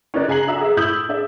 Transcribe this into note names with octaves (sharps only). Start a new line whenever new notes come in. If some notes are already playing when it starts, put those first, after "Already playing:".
C#4 D#4 A#4 D5 F#6
C#3 G#5 A#5 C7 F#7
D4 F#4 E5 A#5
G#4 E5
A2 E4 D#6 G6 F#7
D4 G#4 D5 E5